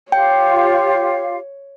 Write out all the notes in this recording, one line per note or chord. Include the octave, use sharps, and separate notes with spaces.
F4 G4 C#5 F5 G5